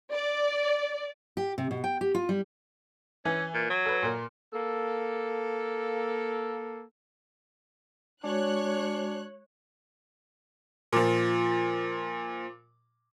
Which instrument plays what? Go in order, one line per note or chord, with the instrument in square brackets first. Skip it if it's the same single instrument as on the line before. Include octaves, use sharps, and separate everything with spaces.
[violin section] D5
[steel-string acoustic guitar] G4
C3
B2
G5
G4
F4
G3
[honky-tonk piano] E3 G#5 [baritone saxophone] C#4
[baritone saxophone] A#2
F#3
[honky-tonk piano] A4 B4
A#2 A#4
[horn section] A#3 A4
[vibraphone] G#3 F#4 [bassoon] D4 [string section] C#5 F#6
[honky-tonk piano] A#2 F3